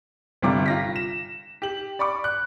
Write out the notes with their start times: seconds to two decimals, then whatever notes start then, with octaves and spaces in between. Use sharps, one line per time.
0.42 G1 C3 G3 F4 D6
0.66 F4 A#6 B6
0.96 E7
1.62 G4 F#7
1.99 D5 B5 C#6 D6
2.24 F#6